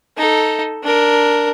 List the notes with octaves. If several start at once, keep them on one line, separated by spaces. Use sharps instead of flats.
D#4 A4
D4 A#4